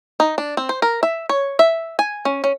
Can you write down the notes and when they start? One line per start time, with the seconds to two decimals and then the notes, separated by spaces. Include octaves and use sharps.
0.20 D#4
0.38 D4
0.57 C4
0.69 C5
0.82 A#4
1.03 E5
1.29 C#5
1.59 E5
1.99 G#5
2.25 C#4
2.44 C#4